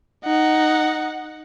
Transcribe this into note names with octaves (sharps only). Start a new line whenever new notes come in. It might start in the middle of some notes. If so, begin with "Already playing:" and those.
D#4 F#5